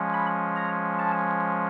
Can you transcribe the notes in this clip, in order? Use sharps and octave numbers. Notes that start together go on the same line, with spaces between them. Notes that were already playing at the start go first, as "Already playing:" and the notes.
Already playing: F3 G#3 C#4
B5
A#5
A5